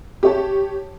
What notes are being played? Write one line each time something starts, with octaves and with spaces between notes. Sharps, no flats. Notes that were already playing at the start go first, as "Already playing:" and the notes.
G4 C#5 A5